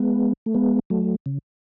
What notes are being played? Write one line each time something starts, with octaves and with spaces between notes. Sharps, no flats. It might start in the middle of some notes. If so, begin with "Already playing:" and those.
Already playing: G#3 B3
A3
G#3 B3
F#3 A3
C#3